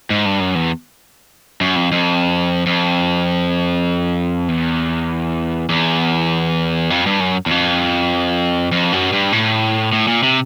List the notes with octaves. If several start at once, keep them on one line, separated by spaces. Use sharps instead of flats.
G#2
G2
F#2
E2
F#2
F2
F2
F2
E2
E2
F2
G2
F#2
E2
F2
F2
F#2
G2
A2
A2
A#2
C3